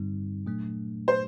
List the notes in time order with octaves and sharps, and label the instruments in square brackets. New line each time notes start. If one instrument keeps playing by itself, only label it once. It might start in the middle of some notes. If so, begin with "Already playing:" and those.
Already playing: [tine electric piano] G2 D3 G3 C4 D#4
A#2 F#3 A3 D4
[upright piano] C5